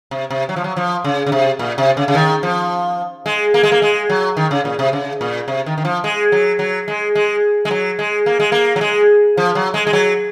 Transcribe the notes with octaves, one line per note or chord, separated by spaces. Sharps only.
C3
C3
F#3
F3
F#3
F3
C#3
C#3
C3
A#2
C3
C#3
C#3
D#3
F3
G#3
A#3
G#3
A#3
G#3
F#3
D#3
C#3
A#2
C3
C#3
A#2
C3
D#3
D#3
F3
G#3
F#3
F#3
G#3
G#3
G#3
F#3
G#3
A#3
G#3
A#3
F#3
G#3
F3
F#3
G#3
G#3
F#3